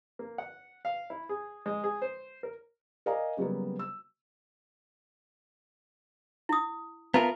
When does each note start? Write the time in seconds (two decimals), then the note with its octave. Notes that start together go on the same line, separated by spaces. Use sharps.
0.19 A#3
0.38 F#5
0.85 F5
1.10 E4
1.29 G#4
1.66 G#3
1.84 G#4
2.02 C5
2.43 A#4
3.06 A#4 D5 D#5 F5 G#5 A#5
3.37 C#3 F#3 G3 A#3 B3
3.79 E6
6.49 E4 D#6
7.14 B3 F4 A#4 E5 A5 A#5